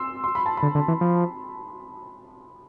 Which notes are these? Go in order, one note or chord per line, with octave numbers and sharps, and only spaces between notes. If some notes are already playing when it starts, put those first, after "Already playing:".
Already playing: C6 E6
C6
B5
A5
B5
D3
D3
E3
F3